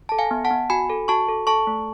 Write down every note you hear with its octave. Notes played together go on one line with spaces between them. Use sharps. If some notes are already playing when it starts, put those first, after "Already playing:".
A4 A5
F5 G#5
B3
F#5 A5
B3
F#4 G#5 B5
A4
F#4 A5 C#6
A4
A4 A5 C#6
A3